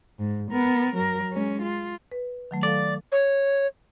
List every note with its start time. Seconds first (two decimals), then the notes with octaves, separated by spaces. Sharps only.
0.19 G#2
0.51 B3 A#4
0.95 F#3 A#4
1.32 G#3 C#4
1.62 F4
2.12 B4
2.51 D#3 F#3 A3
2.63 A4 D5 F5
3.12 C#5